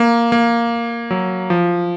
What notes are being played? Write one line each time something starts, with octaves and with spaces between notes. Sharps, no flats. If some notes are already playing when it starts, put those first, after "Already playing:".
Already playing: A#3
A#3
F#3
F3